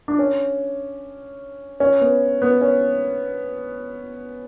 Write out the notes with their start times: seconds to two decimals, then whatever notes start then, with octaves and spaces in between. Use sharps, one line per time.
0.08 D4
0.19 C#4
1.80 C#4
2.01 B3
2.42 B3
2.61 C#4